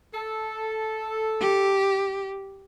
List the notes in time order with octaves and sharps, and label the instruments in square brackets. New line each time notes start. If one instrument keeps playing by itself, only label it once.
[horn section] A4
[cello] G4